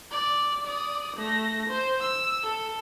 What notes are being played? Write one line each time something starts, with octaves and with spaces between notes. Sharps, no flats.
D5
D5 D#6
A3 A#6
C5
E6
A4